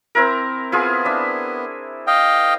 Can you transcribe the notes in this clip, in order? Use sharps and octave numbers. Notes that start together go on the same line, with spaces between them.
C4 E4 A#4
B3 E4 F4 G#4
D4 E5
D#5 F5 G5